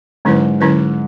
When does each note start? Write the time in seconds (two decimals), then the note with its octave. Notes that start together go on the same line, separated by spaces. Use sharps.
0.25 G#2 D3 F#3 C#4 E4 B4
0.61 D3 F#3 C#4 E4 B4